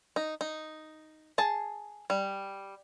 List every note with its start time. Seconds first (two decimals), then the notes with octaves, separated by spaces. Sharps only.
0.16 D#4
0.41 D#4
1.38 G#4 A5
2.10 G3